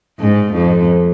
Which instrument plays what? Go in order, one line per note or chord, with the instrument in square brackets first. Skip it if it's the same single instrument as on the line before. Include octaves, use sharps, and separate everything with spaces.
[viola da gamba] G#2
F2